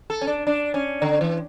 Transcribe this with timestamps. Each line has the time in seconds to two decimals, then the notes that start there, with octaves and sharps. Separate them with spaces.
0.10 A4
0.21 C#4
0.27 D4
0.47 D4
0.74 C#4
1.02 D3
1.21 E3